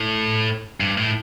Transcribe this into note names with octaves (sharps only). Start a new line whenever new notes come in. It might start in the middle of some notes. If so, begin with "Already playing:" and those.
Already playing: A2
G2
A2